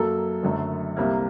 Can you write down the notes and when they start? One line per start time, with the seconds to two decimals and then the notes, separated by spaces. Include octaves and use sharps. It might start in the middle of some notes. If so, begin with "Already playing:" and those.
Already playing: F#2 F#3 A#3 A4
0.43 F#1 F#2 D3 A3
0.96 C2 C3 G3 A#3